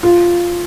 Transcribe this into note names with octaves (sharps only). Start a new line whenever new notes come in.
F4